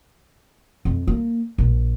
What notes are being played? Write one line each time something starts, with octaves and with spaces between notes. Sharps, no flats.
F2
A#3
A#1